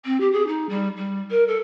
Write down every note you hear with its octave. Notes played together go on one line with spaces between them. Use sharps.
C4
G4
G#4
D#4
G3
G3
A#4
A4